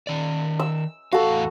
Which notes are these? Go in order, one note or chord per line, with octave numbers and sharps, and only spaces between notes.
D#3 D5
E6
E2 A2 F#4 A4 F5